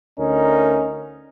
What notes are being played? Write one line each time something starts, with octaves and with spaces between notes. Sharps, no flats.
D2 C#4 D#4 A#4